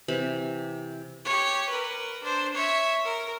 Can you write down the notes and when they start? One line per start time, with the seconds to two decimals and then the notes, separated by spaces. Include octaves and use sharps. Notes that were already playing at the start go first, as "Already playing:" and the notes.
0.08 C3 E3 B5
1.25 G4 C#5
1.69 A#4 B4
2.23 D4 C5
2.54 C#5 E5
3.05 A#4